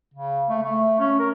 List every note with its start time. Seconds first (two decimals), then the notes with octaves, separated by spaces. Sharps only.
0.14 C#3
0.49 A3
0.63 A3
0.99 C#4
1.20 A#4